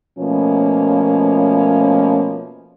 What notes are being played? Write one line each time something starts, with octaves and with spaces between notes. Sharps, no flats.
B2 F3 A3 A#3 C#4